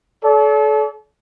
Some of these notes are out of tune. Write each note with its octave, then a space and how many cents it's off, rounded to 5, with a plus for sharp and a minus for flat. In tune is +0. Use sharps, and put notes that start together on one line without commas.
A4 -35 D5 -45